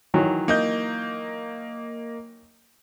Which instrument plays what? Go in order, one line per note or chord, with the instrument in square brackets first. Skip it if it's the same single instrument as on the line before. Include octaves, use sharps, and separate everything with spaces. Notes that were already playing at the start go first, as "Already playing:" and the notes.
[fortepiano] D#3 E3 F#3
[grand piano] A#3 D#5 G6